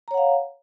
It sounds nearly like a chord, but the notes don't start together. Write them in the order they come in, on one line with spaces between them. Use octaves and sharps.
A#5 C#5 F#5 F5